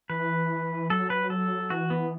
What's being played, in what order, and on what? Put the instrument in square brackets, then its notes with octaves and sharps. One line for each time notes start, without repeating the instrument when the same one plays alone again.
[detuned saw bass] E3 [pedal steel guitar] B4
[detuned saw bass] F#3 [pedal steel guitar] A4
[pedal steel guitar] B4
A4
[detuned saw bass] E3 [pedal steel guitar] F#4
[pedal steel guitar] B3